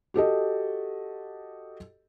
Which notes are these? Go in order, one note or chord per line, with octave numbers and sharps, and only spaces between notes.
F#4 G4 A4 D#5